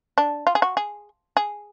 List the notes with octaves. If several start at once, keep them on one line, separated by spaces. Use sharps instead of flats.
D4
F4
G#4
F#4
G#4
G#4